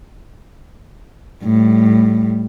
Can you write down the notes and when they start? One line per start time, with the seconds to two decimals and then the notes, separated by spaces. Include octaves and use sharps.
1.43 A2 G3